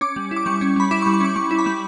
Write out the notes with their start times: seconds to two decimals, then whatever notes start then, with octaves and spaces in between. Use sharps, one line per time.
0.01 C#4 D6
0.16 G3
0.31 E4
0.36 D6
0.46 G3 C#6
0.57 D6
0.61 C#4
0.76 G3 B5
0.91 E4 D6
1.02 C#6
1.06 G3
1.14 C#6
1.21 C#4 D6
1.36 G3 C#6
1.51 E4
1.59 B5
1.66 G3